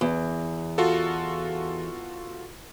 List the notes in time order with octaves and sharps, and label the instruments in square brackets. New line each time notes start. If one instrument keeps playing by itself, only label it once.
[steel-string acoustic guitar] E2
[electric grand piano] F4 F#4 A4